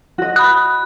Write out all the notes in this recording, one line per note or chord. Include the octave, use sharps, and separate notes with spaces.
F#4 D#5
B5 D#6 F#6